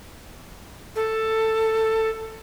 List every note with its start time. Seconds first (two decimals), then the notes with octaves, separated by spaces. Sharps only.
0.96 A4